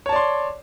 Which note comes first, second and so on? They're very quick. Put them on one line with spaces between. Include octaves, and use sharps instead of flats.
C#5 A5 D5 C6